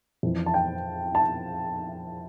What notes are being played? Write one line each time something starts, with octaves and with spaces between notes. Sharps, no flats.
F2 E3
A5
G5
A5